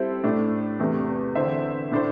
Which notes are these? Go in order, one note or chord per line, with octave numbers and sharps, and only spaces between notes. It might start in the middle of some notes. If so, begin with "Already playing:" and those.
Already playing: G3 C4 E4 A4 C5
A2 A3 D4
E2 C3 A3
D3 C4 E4 C5 E5
A2 A3 D4 C5